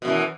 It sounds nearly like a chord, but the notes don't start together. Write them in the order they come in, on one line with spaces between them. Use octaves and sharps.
B2 F#2 E3